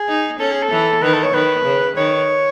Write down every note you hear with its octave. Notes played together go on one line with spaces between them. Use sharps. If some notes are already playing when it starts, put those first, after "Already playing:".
Already playing: G#4
D#4
C#4 A4
G#4
A4
E3
D#3 B4
A4
C#5
D#3 B4
C#3
D#3 C#5